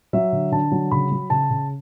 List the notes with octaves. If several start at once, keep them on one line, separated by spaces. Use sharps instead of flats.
F#3 E5
D3
D3 A5
F#3
C#3 B5
F#3
C#3 A5
C#3